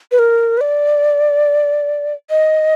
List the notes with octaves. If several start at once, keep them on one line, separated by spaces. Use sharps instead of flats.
B4
A#4
B4
D5
D#5